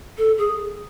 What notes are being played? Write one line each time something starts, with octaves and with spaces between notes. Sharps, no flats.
A4
G#4